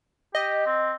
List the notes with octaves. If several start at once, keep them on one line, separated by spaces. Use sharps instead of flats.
G4 D#5
C4